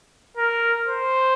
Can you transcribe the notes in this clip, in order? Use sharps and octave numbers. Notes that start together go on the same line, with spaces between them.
A#4
C5